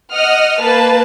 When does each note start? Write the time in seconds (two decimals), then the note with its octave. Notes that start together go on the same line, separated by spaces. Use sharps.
0.13 D#5 F#5 D#6 F6
0.61 A#3 B4 A5